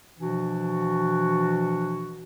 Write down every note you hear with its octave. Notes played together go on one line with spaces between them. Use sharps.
B2 E3 F3 D4 F#4